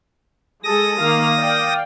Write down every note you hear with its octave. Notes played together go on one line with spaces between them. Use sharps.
G#3 G#4 A4 D#6 A#6
D#3 A#3 F5
D5 F5 G5